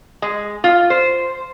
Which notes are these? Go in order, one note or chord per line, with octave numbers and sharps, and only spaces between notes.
G#3
F4
C5